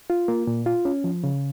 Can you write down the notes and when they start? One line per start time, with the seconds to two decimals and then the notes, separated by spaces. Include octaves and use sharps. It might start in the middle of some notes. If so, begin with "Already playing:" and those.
0.10 F4
0.28 A#3
0.47 A#2
0.66 F4
0.85 C#4
1.04 F3
1.24 C#3